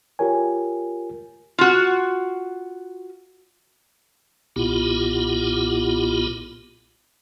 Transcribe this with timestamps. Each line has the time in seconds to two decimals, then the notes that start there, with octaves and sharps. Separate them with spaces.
0.19 F4 G4 A#4 C#5 G#5
1.59 F4 F#4
4.56 B1 A#2 B3 E4 F4 G4